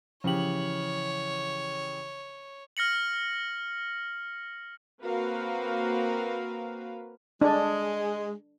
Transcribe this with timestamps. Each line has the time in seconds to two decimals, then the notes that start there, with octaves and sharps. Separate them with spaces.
0.24 C#3 E3 F3 G4 C#5 F#7
2.77 F6 A#6 C#7 F#7
5.02 A#3 C4 F#4 A#4 B4 F5
7.41 G#3 D4